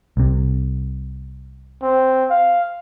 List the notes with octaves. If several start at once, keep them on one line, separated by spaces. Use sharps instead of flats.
C2 C3
C4
F5